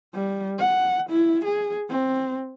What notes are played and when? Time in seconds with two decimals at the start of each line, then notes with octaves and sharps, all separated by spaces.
0.14 G3
0.58 F#5
1.09 E4
1.45 G#4
1.89 C4